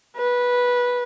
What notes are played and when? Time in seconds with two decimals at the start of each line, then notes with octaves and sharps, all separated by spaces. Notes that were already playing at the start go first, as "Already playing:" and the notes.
0.17 B4